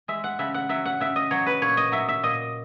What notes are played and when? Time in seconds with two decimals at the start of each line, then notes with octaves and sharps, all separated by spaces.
0.08 G#3 E5
0.24 F#5
0.39 C#3 E5
0.54 F#5
0.69 F#3 E5
0.85 F#5
1.00 C#3 E5
1.16 D#5
1.31 F#3 C#5
1.46 B4
1.62 A#2 C#5
1.77 D#5
1.92 F#3 E5
2.08 E5
2.23 A#2 D#5